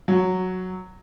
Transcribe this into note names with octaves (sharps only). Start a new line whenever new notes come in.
F#3